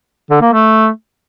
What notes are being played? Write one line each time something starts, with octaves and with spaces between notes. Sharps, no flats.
D3
A#3
A3